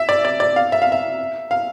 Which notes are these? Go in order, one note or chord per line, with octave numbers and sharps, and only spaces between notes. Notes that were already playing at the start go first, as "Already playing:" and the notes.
Already playing: E5
D5
D5
D5
F5
E5
F5
E5
F5